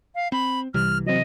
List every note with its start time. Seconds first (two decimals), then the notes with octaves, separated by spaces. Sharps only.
0.15 F5
0.32 C4 B5
0.74 C2 C3 E3 G3 F6
1.06 F#3 C4 D#5